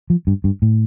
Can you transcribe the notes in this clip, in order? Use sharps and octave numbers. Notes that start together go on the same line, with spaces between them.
F3
G2
G2
A2